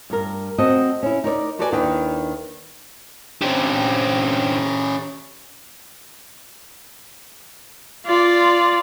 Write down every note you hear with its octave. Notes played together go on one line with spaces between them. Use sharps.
G2 A#4
C4 F#4 A4 D#5
C#4 E4
D#4 A#4 C#5 D5
F#4 G4 A4 B4 D5 G#5
D#2 D#3 D4 E4 B4 G5
D3 C4 C#4 G4
F4 D5